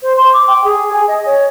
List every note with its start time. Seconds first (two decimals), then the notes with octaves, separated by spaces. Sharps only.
0.03 C5
0.17 C6
0.33 D6
0.48 G5
0.64 G#4
0.93 G#5
1.08 D#5
1.26 C#5